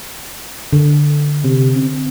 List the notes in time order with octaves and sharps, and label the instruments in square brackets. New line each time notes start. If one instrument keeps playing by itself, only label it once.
[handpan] D3
[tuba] C3
C4